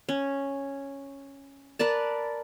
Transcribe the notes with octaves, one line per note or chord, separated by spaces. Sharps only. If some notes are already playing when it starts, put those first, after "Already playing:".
C#4
A#4 B4 D5 A5